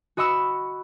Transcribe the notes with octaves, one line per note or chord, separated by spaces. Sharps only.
F#4 D#5 B5 C#6 E6